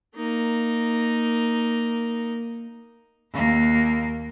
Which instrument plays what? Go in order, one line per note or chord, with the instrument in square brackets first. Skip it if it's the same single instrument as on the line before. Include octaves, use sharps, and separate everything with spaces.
[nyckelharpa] A#3 D#4
[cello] D#2 A#3